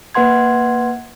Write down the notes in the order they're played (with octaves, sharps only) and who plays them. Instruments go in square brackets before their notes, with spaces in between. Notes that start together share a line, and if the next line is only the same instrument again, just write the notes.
[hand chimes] A#3 B4 F#5 C6 G#6